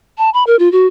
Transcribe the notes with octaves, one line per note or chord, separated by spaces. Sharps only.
A5
B5
A#4
F4
F#4